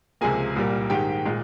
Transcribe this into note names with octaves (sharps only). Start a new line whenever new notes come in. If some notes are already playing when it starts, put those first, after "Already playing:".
C#2 C3 F3 A#3 G#4 G#5
C2 A#2 G3 A#3
G#2 D#3 G#3 G4 G5
A#2 G#3